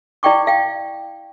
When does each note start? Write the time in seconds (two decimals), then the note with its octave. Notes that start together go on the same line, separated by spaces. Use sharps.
0.23 E4 D5 F5 G5 C#6 D6
0.47 F5 G5